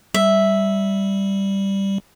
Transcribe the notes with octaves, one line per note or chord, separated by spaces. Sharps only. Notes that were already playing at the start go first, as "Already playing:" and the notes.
G3 E5